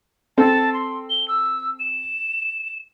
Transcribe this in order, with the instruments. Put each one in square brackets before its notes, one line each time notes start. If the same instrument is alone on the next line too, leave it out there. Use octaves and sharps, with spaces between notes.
[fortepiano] C4 A4 [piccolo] A5
[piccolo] C6
G7
E6
E7